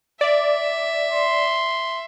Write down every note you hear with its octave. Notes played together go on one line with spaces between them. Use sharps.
D5 E5
C6